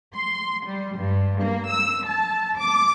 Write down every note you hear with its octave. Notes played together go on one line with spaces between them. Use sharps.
C6
G3
G2
A#3
E6
A5
D6